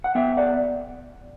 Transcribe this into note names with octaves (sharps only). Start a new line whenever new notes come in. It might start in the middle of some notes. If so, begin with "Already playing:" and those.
F#5
B3 E5 G5
D5 F#5